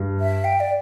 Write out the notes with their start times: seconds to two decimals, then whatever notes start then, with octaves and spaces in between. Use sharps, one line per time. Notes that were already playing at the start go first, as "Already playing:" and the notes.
Already playing: G2
0.20 E5
0.44 G5
0.60 D5